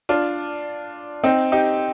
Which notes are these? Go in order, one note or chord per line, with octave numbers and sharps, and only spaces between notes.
D4 F4
C4 D#4
D#4 G4